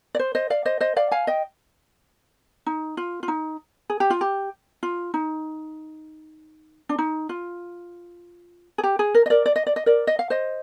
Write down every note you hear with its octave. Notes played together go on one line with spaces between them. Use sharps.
D5
C5
C5 D#5
D5 F5
C5 D#5
C5 D#5
D5 F5
F5 G#5
D#5 G5
D#4
F4
F4
D#4
G#4
G4
F4
G4
F4
D#4
D4
D#4
F4
G#4
G4
G#4
A#4
D#5
A#4 D5
D5
D#5
D5
D#5
A#4 D5
D#5
F5
C5 D#5